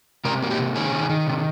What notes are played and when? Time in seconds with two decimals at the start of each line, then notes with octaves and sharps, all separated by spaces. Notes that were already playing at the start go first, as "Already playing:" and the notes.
0.25 C3 A#4
0.42 A#3
0.51 G4
0.58 C3
0.75 D#3 G#4
0.92 D#3
1.10 D#3
1.27 C3